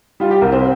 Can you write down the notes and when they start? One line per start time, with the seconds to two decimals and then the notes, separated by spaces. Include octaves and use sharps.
0.20 G3 F4
0.31 G4
0.41 C2 A#4
0.52 C4